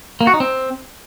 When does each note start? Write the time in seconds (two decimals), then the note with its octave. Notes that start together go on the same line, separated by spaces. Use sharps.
0.21 A#3
0.27 F#4
0.34 D#4
0.40 C4